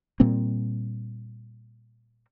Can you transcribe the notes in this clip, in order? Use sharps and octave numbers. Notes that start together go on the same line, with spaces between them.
A#2 G3 A#3 C4